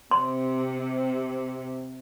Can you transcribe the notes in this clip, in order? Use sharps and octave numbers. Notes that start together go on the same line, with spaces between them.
C3 C6